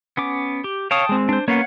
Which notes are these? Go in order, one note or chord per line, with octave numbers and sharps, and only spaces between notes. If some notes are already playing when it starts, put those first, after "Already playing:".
B3 C#4 D6
G4
C#5 F5 G5 A5 D#6
G#3 C4
D4 C5
A#3 B3 C#4 C#5 F5 F#5